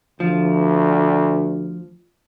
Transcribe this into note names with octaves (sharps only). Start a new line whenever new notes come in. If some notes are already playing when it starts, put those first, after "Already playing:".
D2 F3